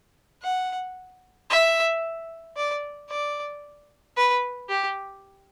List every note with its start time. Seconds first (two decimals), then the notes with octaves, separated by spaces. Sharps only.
0.43 F#5
1.50 E5
2.57 D5
3.10 D5
4.17 B4
4.69 G4